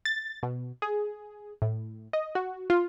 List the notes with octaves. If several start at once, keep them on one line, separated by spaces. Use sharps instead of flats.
A6
B2
G#4
A2
D#5
F#4
F4